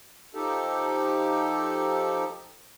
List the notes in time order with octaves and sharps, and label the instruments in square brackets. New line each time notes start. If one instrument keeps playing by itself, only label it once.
[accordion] F3 D#4 G4 A4